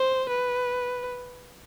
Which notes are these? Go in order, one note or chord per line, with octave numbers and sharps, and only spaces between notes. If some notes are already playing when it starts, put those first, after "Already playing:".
Already playing: C5
B4